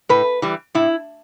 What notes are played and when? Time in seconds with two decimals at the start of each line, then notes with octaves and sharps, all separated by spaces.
0.09 A2 B4
0.42 E3 G3
0.75 A2 E4